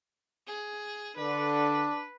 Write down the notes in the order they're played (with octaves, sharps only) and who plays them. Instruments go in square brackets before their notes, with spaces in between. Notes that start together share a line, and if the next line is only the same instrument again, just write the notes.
[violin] G#4
[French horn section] D3 [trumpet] D4 [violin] B4